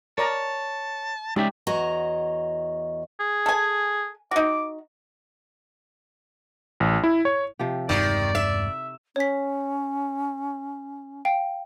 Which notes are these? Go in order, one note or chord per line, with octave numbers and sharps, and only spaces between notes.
A#4 C#5 D5 A5 A#5
G#3 C#4 D#4 G4 D5 E5
E2 F#4 C#5 D#5 A#5
G#4
A4 G#5
D#4 F#4 D6
A1
E4
C#5
C3 F3 G4
E1 G2 D#3 G#3 G4 D5
E5
C#4 C#5 B6
F5 G5